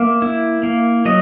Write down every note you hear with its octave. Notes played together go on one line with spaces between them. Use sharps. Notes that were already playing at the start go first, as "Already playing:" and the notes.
Already playing: A#3 E5
E4
A#3
F#3 D#5